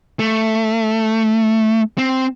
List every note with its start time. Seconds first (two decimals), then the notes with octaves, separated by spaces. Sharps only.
0.19 A3
1.98 C4